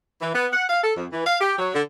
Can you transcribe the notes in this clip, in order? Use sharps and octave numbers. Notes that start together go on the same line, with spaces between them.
E3
B3
F#5
F5
A4
F2
E3
F5
G4
F#3
D3